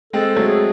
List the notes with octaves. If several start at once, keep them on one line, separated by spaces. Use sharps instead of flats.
G#3 C4 A4
F#3 A3
G#4